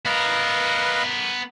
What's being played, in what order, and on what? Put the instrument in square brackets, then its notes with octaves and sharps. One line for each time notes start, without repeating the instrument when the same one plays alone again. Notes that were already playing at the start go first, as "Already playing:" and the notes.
[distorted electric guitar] B3 A#4 [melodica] B4 D#5 F5